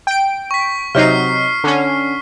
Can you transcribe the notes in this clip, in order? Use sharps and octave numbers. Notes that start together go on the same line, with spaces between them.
G5 D7
C#6 B6
C3 F#3 D#4 F6 C7
D3 C#4